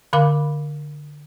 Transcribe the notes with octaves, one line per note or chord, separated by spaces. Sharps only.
D3 A#4 F5 B5 D6